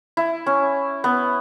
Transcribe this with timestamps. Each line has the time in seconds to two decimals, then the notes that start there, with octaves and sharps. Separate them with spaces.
0.17 E4
0.46 C#4
1.04 B3